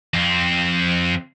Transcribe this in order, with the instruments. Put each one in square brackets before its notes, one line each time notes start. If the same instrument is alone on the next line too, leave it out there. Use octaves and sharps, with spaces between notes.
[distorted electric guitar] F2 C4